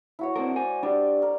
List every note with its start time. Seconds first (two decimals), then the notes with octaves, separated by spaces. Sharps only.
0.19 E4 F#4 C#5
0.36 C4 D4 A#4 C5 D#6
0.56 C5 D5 G#5
0.83 G3 D4 G4 D5
1.22 A#4